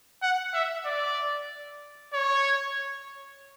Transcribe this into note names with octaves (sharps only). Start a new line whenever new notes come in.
F#5
E5
D5
C#5